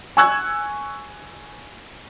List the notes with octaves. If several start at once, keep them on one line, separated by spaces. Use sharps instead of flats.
G#5 C#6 E6 F#6 G#6